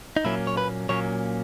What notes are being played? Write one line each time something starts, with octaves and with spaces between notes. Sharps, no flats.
D#4
A#2 F#3 A#3 C#4 E4
C#5
B4
A#2 F#3 A#3 C#4 C#5